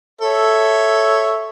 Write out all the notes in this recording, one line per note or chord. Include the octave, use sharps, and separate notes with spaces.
A4 C#5 E5